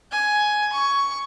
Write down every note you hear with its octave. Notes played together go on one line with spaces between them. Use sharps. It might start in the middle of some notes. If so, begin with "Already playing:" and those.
G#5
C#6